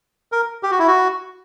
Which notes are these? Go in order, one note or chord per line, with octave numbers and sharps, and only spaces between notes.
A#4
G4
F#4
E4
F#4